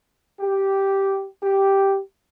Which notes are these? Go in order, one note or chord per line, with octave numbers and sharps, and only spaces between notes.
G4
G4